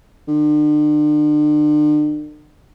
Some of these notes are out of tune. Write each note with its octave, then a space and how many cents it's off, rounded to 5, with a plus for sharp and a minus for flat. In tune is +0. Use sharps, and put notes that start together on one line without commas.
D3 +40